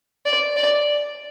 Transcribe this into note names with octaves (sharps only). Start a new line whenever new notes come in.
D5
D5